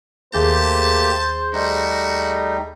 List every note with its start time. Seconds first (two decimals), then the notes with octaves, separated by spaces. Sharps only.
0.34 D#2 A3 A#3 G4 G#4 C5 A5 G6
1.53 G3 A3 D#4 F#4